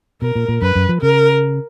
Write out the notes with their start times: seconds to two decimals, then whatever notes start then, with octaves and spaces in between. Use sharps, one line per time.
0.22 B2 A#4
0.35 A#2
0.48 A#2
0.62 F#2 B4
0.75 F#2
0.89 F3
1.01 C#3 A#4